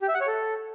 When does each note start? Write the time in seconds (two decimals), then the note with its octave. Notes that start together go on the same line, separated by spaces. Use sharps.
0.02 G4
0.08 E5
0.15 F#5
0.21 C#5
0.27 A4